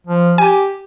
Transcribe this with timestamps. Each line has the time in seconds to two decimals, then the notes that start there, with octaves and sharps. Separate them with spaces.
0.07 F3
0.38 G4 G#5